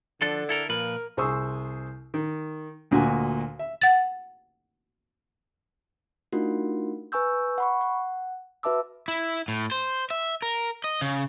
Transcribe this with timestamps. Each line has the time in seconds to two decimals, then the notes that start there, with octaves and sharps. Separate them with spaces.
0.22 D3 F3 D4 A4
0.49 E4 A4 A#4
0.69 A#2 F3 A#4 B4
1.17 C2 G#4 C5 C#6 D#6 E6
2.14 D#3
2.91 D2 A#2 F#4 G#5
3.59 E5
3.82 F#5 A6
6.33 A3 D4 D#4 F4 F#4 A#4
7.12 B4 G#5 C#6 E6 G6
7.58 F#5 B5 C#6
7.81 F#5
8.63 F#4 B4 E5 A5 D6 E6
9.08 E4
9.48 A2
9.71 C5
10.11 E5
10.42 A#4
10.84 D#5
11.01 C#3